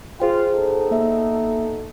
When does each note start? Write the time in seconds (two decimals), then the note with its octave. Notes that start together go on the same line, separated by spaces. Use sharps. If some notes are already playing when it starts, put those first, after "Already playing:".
0.20 F4 G#4 C5 G5
0.53 B2 D#4 A4
0.91 A#3 E5